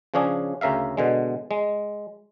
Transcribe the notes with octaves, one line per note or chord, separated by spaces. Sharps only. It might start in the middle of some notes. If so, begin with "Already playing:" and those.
C#3 F3 C#4 D4 G#4
D2 C#3 A#4 E5 F5
B2 D3 G#3
G#3